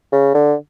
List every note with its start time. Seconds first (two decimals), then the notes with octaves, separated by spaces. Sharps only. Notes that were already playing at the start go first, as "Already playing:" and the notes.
0.13 C#3
0.35 D3